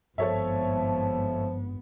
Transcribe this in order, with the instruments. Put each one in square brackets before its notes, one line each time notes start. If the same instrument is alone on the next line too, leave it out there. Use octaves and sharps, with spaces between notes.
[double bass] G#1 B3 [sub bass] G2 [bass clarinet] F3 [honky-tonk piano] A4 C#5 E5